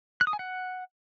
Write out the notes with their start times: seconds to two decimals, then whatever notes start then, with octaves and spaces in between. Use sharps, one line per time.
0.21 F#6
0.27 D#6
0.33 G#5
0.39 F#5